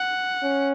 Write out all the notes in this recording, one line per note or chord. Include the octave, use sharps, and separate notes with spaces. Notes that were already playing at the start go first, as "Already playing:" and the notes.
Already playing: F#5
C#4